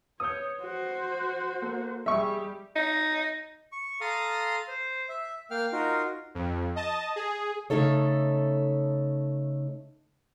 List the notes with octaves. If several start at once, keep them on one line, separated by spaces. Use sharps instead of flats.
B4 C#5 D#6 G6
F#4 C5
A#3 A4
G3 G4 G#4 D#5 E5 C#6
D#4
C#6
A4 F5 A#5 C6 D#6
C5
E5
A#3 F5 G5 F6
D#4 F4 F#4 A#4
F2
D#5 A5
G#4
C#3 A3 D#4 A4 C#5